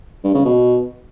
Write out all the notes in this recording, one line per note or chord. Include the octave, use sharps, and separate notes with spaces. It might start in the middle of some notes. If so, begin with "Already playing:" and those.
G2
C#3
B2